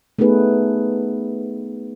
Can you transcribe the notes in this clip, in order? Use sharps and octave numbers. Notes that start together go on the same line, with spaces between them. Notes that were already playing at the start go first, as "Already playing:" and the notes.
A3 B3 D#4 G#4 B4